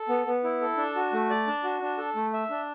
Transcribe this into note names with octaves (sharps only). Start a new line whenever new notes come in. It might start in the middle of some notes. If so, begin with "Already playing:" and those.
Already playing: A4
B3
B3
E4
A4
D4
F#4
A3
D5
D4
F#4
D4
A4
A3
E5
D4